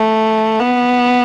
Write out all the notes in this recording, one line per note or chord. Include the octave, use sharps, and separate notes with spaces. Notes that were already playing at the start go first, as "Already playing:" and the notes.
Already playing: A3
B3